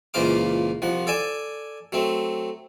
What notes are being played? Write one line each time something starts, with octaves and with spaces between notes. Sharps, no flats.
C#2 A#2 E3 C5 F5 D6
C2 F3 F#5
A4 D5 G#5 A5
F#3 A3 C4